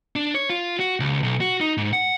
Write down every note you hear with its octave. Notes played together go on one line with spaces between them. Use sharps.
D4
C#5
F4
F#4
C#2
B1
F#4
D#4
G#2
F#5